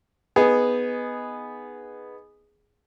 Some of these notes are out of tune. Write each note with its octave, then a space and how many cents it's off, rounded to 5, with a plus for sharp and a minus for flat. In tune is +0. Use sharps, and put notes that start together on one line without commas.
B3 +0 D#4 +0 G#4 +0